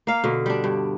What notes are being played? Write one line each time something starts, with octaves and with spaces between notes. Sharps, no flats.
A#3 F5
B2 D3
G3 D4
G2